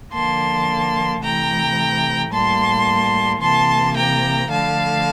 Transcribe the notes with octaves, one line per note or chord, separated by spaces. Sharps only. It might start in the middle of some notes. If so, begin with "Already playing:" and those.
D3 F3 A#3 A5 C6
C3 E3 A3 G5 A#5
A2 G3 A#3 A5 C6
C3 E3 A#3 A5 C6
G5 A#5
D3 F3 A3 F5 A5